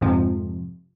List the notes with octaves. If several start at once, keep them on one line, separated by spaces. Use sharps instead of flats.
F2 G#2 C3 F3